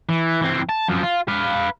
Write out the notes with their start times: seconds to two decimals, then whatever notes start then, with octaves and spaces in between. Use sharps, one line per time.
0.09 E3
0.42 E3 C4
0.69 A5
0.88 F#2 F3
1.03 F4
1.28 B4 F5